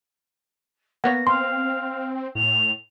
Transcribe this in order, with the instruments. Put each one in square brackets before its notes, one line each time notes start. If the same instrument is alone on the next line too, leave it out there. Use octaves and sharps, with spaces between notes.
[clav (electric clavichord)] A#3 B3 C#5 [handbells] F#5 [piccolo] A#6
[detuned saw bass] C4 [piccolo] F5 [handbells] C6
[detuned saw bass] A2 [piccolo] F7